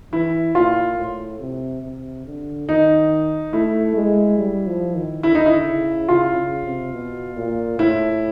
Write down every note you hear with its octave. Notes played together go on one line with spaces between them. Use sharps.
E3 E4
A#2 F4
A2
C3
C3
D3
D#3 D#4
A3 E4
G#3
G3
F3
D#3
D3 E4
D#4
E4
C#3
C#3 F4
C#3
C3
B2
A#2
A2 E4